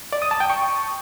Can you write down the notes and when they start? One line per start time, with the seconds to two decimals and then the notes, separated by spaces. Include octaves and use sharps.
0.13 D5
0.22 D#6
0.31 A5
0.40 G5
0.50 C#6